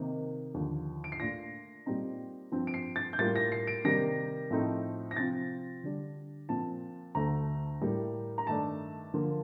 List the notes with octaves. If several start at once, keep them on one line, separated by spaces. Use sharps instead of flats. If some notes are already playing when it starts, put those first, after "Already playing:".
Already playing: C3 D#3 A#3 D#4
D#2 D3 F3
D7
C7
A#2 A3 D4 F4 A#6
A#2 G3 C4 D#4
G2 F3 C4
D7
C7
A6
G6
A2 G3 A#3 F4 A6
A#6
C7
D7
C3 D#3 G3 A#3 A#6
A2 F3 A3 C4 D#4
A#6
C3 F3 C4 F4 A6
D3 G3 D4
A#2 F3 C4 A5
D2 D3 A3 A#5
A2 G3 A#3
A#5
G2 D#3 A3 D4 A5
D3 F3 A#3 F4